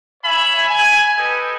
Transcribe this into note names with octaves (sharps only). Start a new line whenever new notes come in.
C#5 E5 G#5 B5
G#5
G4 A4 B4 D#5